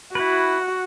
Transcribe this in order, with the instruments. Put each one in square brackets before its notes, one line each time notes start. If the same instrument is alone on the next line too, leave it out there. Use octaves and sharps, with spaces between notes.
[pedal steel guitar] E4 B4 [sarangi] F#4